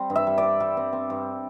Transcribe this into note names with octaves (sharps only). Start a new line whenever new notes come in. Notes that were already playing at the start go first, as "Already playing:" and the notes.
Already playing: G3 C4 C5
G2
E5
G3
D5
C4
G3
C4
C4
G2